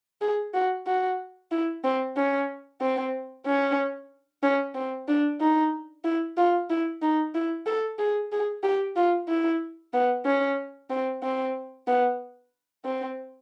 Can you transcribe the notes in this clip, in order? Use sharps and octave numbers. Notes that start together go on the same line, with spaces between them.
G#4
F#4
F#4
E4
C4
C#4
C4
C#4
C#4
C4
D4
D#4
E4
F4
E4
D#4
E4
A4
G#4
G#4
G4
F4
E4
B3
C#4
C4
C4
B3
C4